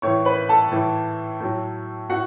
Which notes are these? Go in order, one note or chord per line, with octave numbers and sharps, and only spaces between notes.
A2 E3 C#5 C#6
B4 B5
A4 A5
A2 E3
A2 F#3
A2 F#4 F#5